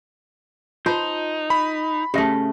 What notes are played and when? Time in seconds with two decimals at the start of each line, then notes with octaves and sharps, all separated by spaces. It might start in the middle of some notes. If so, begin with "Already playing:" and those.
0.86 D#4 F4 C5 A5
1.50 B5
2.14 C#3 A3 G4 E5